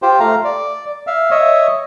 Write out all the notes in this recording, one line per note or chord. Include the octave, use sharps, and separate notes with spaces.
F4 G4 C5
A3 F5 A#5
D5
E5 F5
C#5 D#5 E5